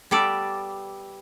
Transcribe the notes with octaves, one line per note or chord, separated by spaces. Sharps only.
G3 B3 A4 D5